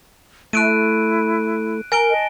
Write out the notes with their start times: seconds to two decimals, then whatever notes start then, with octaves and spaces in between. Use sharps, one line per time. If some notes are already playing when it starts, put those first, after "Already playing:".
0.53 A3 E4 F#6 D7 D#7
1.92 A#4 G#5 D7 G7
2.10 D#5 A5